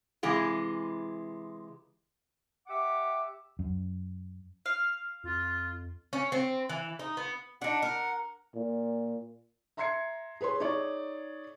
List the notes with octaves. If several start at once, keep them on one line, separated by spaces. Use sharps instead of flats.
C3 E3 G#3 F4
G4 E5 F#5 D6
F#2
F5
F2 F4
C#4
C4
E3
D#4
B3
D4 D#4 F#5
A#4
A#2
E5 A#5 C6 G#6 C7 C#7
G#4 B4 C#5 C6
D#4 G#4 C#5 D5 C#6